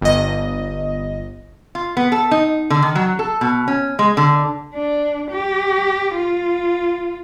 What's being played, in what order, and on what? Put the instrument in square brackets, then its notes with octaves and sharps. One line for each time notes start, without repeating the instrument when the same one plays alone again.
[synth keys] G1 D#5
[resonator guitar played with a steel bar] F4
B3
A4
D#4
D3
D#3
F#3
A4
B2
C#4
G#3
D3
[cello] D4
G4
F4